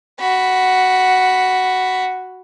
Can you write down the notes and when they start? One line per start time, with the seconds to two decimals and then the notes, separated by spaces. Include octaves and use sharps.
0.19 F#4 B5